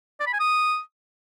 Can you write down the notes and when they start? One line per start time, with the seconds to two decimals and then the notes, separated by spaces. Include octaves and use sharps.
0.20 D5
0.27 B5
0.33 G#5
0.40 D#6